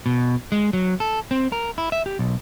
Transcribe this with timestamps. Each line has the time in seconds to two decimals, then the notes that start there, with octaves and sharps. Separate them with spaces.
0.06 B2
0.52 G#3
0.73 F#3
1.00 A4
1.31 C4
1.52 A#4
1.78 E4
1.92 E5
2.06 G4
2.19 B1